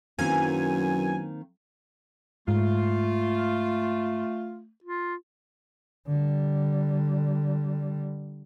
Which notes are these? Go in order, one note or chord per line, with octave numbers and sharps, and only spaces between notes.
F#2 D#3 F#3 A#3 C4 E4 B4 G#5
G#2 A3 F4
F4
D3 G3